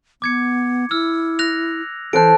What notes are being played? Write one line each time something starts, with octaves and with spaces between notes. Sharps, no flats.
B3 D6 G#6 C#7
E4 E6 F6
F#6 A#6 F7
E3 A4 C5 A5 F#6 D7